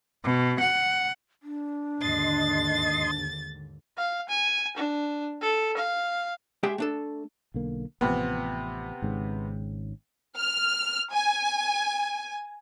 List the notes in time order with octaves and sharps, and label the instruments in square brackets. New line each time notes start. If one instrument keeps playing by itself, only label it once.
[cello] B2
F#5
[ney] D4
[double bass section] D#2 G#2 D3 [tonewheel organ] D#5 C6 [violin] A6
[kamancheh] F5
G#5
D4
A4
F5
[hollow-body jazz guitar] G#3 G4 G#4 E5 G5
A3 D4 A4
[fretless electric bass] B1 D3 A#3
[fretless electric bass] A1 F3 [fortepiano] C3 B3
[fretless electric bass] G#1 G#2 C#3
[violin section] F6
G#5